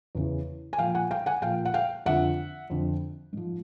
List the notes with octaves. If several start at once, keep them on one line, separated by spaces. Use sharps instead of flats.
E2 C#3 E3
G#5
A#2 F3 F5 G5
F#5 G#5
F5 G5
F#5 G#5
A#2 F3 F5 G5
F#5
F5 G5
F2 D3 F3 E5 F#5
F2 D3 F3
G#2 F3